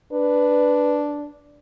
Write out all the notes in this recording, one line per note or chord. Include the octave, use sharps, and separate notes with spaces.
D4 B4